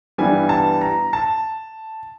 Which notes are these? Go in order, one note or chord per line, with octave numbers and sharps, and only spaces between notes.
G2 E3 G3 B3 G#5
A5
A#5
A5